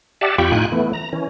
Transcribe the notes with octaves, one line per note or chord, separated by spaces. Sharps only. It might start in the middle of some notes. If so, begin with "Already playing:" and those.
G4 D5 E5 F#5 A5
F2 F4 G4 G5 B5 C#6
A2 D#4 F4 G5 G#5 F#6
E3 A3 B3
A#5
E3 C#4